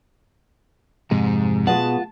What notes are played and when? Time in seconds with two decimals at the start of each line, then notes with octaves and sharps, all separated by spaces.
1.11 F2 G#2 C3 G#3
1.67 B2 G#3 F4 F#5 A5